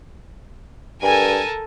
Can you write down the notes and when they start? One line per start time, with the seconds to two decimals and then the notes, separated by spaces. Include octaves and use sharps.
1.02 G2 A4 A#4 G#5